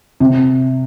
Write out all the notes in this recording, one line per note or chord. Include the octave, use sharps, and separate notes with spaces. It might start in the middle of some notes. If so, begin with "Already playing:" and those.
C3